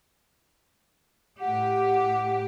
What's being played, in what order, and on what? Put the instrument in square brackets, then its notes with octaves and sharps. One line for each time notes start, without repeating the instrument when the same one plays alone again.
[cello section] A2 G4 [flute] F#5